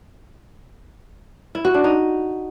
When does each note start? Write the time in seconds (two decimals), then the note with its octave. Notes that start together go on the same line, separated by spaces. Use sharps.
1.55 E4
1.65 F#4
1.74 D4
1.84 D#4